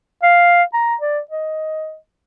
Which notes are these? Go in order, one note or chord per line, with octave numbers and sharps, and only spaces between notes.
F5
A#5
D5
D#5